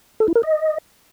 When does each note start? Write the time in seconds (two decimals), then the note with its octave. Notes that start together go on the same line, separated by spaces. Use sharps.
0.20 A4
0.28 E4
0.36 A#4
0.43 D#5